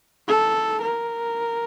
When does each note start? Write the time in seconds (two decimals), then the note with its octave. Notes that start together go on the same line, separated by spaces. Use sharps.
0.28 A4
0.82 A#4